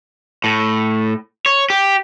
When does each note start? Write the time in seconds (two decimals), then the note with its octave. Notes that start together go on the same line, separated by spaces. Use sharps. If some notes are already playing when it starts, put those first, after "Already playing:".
0.44 A2
1.46 C#5
1.70 G4